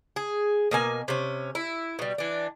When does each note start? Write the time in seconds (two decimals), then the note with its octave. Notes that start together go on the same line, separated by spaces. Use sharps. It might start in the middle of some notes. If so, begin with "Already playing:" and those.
0.16 G#4
0.71 B2 A#3 G#5
1.08 C3 C#4
1.55 E4
1.99 B2 G3
2.18 E3 D4